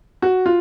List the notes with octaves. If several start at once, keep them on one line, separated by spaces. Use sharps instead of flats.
F#4
F4